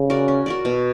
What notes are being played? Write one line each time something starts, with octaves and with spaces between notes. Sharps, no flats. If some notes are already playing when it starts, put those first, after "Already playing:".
Already playing: C#3
F#4 A#4 D5
C#4
F#4 A#4 D5
B2